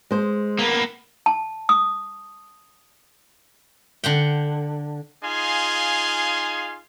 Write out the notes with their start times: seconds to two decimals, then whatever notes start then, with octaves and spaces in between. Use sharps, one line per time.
0.11 G#3 C5
0.59 A#3 B3
1.26 A5
1.69 D#6
4.04 D3 F#5 G5
5.23 D#4 F4 G#4 F5 G#5 C6